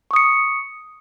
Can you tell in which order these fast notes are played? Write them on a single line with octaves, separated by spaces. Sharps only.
C#6 D#6 C#7